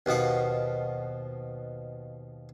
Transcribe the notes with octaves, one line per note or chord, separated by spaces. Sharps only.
D#2 B2 F3 F#5